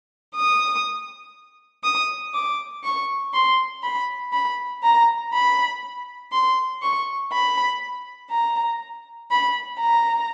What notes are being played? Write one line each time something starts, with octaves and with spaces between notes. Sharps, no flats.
D#6
D#6
D6
C#6
C6
B5
B5
A#5
B5
C6
C#6
B5
A#5
B5
A#5